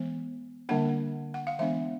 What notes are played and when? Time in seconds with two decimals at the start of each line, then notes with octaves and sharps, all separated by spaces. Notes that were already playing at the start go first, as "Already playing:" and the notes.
Already playing: E3 G#3 B3
0.69 D3 G3 A#3 D4 F#5
1.34 F#5
1.47 F5
1.59 E3 G#3 B3 D4 E5